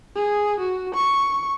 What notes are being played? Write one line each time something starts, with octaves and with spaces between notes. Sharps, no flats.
G#4
F#4
C#6